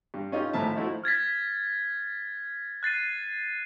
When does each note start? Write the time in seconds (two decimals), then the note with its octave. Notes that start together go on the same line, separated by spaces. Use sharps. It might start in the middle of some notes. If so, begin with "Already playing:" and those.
0.14 G2
0.32 C#4 D#4 F4 G4
0.53 G#1 A2 F3 E5 A5
0.76 F3 A3 D#4 E4 F#4
1.04 F6 G#6 A6 B6
2.83 F#6 A6 C7 D#7